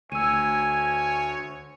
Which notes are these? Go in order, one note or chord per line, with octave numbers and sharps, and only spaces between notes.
D2 C#5 G#5 E6 D#7